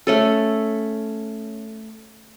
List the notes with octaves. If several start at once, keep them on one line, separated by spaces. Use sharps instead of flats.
A3 C#4 A4